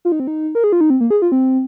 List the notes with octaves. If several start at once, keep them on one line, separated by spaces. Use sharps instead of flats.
F4
D#4
C4
D#4
A#4
G#4
F4
D#4
C4
A#3
G#4
F4
C4